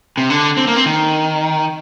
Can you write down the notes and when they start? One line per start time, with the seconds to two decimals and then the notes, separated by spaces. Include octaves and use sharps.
0.17 C3
0.30 D3
0.57 C4
0.67 A#3
0.76 C4
0.86 D#3